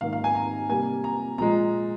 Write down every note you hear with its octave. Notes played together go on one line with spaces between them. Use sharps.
G#2 D#3 A#3 F5
F5
G#5
A#5
C3 G3 A#3 G#5
A#5
A#2 F3 G#3 A#5